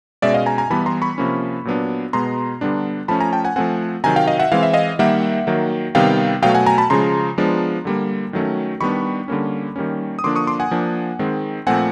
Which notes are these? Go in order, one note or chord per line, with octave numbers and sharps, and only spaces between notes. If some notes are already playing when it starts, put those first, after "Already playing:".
B2 G#3 C#4 D5 E5
D#5 F5
G#5 A#5
G#5 A#5
E3 G3 B3 A5 B5
A#5 C6
B5 C#6
C3 F3 A#3 C#4
A#2 F#3 B3 D4
B2 G#3 B3 A#5 C6
D3 G3 B3 D4
F3 A3 C#4 A5 B5
G#5 A#5
G5 A5
F#5 G#5
F3 A3 C4 F#5 G#5
C3 D#3 F#3 G#5 A#5
F5 G5
D#5 F5
E5 F#5
E3 G#3 C4 F5
E5
D#5 F5
D#3 G3 A#3 E5 F#5
D#3 F#3 A#3
C3 D#3 G3 B3 F5 G5
B2 F#3 A3 F5 G5
F#5 G#5
G#5 A#5
A5 B5
C#3 F3 G#3 A#5 C6
F3 G#3 B3 D4
D3 G3 A#3
D#3 F#3 A3 C#4
D#3 G3 B3 D4 B5 C#6
D3 G3 A#3 C#4
D#3 G3 A#3 C#4
D#6
D3 F3 A#3 D4 C6 D6
C#6 D#6
C6 D6
F#5 G#5
F3 A#3 D4
D#3 G#3 C4
A#2 F3 A3 C4 F#5 G#5